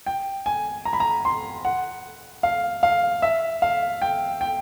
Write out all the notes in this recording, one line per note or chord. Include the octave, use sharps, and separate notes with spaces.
G5
G#5
A#5
B5
A#5
C6
F#5
F5
F5
E5
F5
G5
G5